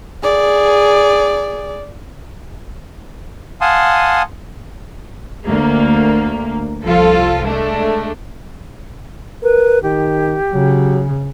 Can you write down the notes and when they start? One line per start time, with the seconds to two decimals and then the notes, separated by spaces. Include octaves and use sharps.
0.23 G#4 D5
3.61 F5 F#5 G#5 A5 C6 D#6
5.48 D2 A#3
6.84 C2 F3 F4 A4
7.45 G#3 A3 D4
9.43 A#4 B4
9.83 D#3 G4
10.53 C#3 F#3